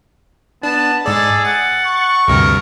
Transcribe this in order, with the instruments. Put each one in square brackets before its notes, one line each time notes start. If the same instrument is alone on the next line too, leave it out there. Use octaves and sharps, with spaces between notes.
[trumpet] B3 [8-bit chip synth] D4 [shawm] A5
[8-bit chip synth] G#2 D5 [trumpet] G#4 [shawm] A4
[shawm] F#5 [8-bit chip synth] A6
[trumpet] C#6
[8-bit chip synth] D2 G2 C3 [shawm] A#4